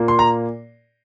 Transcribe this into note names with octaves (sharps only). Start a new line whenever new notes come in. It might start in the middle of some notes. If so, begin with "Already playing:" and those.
Already playing: A#2 A#3
C6
A#5